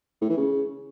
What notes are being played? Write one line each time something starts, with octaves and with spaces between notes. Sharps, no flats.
A2
E3
C#3